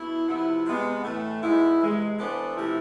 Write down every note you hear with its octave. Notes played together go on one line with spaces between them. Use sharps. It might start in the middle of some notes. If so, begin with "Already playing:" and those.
Already playing: B2 E4
C3 F3 B3 E4
C3 G#3 B3
A2 E3 A3
G#2 G#3 B3 E4
C3 E3 G#3
E3 B3 D4 A4 C5
C3 F3 A3 E4